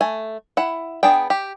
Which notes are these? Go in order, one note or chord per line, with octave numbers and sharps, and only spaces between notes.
A3 G#5
E4 F#5
B3 D4 G#4 G5
G4